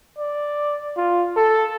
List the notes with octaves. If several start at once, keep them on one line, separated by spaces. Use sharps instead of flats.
D5
F4
A4